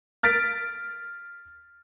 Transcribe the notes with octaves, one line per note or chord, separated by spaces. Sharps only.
F6 A6 B6 D7